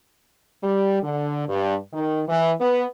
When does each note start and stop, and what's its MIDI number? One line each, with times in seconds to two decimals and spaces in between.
0.63 1.02 55
1.03 1.46 50
1.48 1.76 43
1.93 2.22 51
2.28 2.54 52
2.60 2.85 59